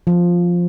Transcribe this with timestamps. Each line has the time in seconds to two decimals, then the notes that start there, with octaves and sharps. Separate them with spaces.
0.07 F3